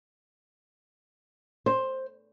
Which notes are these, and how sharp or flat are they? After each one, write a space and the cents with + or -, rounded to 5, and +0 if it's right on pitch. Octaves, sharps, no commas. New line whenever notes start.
C5 +10